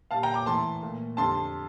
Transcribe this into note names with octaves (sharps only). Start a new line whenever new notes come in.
A#2 G3 F5 A5
G5 A#5
A#5 D6
A2 E3 A3 A5 C6
A#2 A3
F2 D3 G3 A5 C6